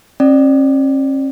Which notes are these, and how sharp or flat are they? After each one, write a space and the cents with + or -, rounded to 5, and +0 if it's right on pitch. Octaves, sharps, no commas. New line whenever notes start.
C#4 -40 D5 +20